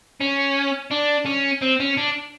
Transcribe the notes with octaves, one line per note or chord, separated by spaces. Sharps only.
C#4
D4
C#4
C4
C#4
D4